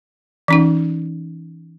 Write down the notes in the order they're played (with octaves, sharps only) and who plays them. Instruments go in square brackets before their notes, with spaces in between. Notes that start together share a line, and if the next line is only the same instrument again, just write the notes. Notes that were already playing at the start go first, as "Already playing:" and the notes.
[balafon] E3 C#4 D#4